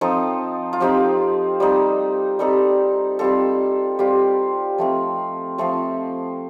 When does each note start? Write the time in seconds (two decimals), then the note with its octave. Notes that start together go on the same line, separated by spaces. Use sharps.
0.01 F3 C4 D#4 A4
0.73 F4
0.80 F3 C4 D#4 G4
1.60 G3 C4 D#4
2.39 G3 C4 D#4 A4
3.19 G3 C4 F4 A4
3.99 G3 C4 F4 G4
4.78 F3 A3 C4
5.58 F3 A3 C4 A4